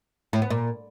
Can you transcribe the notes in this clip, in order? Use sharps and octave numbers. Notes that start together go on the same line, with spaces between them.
A2
B3
A#2